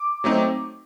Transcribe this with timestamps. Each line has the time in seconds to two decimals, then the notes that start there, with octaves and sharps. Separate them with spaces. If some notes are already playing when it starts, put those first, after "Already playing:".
Already playing: D6
0.24 F#3 A3 C4 D#4